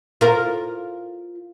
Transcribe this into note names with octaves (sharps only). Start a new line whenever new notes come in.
F4 A#4